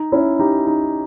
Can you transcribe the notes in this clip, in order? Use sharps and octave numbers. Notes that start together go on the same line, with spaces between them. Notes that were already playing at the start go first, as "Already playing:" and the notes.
Already playing: D#4
C#4 E4
D#4 G4
D#4